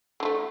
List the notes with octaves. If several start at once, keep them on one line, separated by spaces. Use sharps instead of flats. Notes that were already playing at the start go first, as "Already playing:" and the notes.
D3 F3 A3